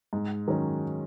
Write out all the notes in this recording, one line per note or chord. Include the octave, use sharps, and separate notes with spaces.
G#2
D#3 F#3 C#4